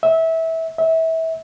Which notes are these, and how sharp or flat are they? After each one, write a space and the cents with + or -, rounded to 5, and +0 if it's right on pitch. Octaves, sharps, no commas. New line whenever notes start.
E5 -20
E5 -25